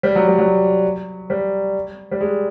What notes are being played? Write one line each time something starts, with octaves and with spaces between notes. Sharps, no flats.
G3
F#3
G3
F#3
G3
G3
G#3